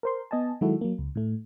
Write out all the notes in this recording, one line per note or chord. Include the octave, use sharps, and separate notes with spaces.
A#4 C5 C6
B3 D#5 G#5 A5
D#3 F#3 G#3 E4 F#4 A4
F#3 A#3
C#2
A2 A3